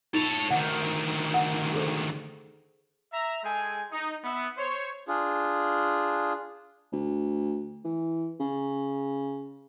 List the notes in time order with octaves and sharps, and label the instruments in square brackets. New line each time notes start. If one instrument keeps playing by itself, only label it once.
[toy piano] D#4 F4 [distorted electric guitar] A4 C#5
[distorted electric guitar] D2 D#3 [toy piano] F#5
[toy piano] F#5
G#4 A4 C5
[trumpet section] E5 A#5
G#3 G#4 A4 G5 G#5
D#4
B3 E5
C5 C#5
[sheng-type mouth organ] D4 F4 G#4
[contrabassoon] D2
E3
C#3